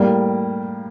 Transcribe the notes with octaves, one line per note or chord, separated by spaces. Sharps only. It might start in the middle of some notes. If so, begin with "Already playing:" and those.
Already playing: A2 G3 A#3